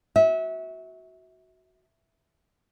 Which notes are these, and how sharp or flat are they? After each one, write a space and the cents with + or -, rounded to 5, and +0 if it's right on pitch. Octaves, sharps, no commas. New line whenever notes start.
F#4 +0 E5 -25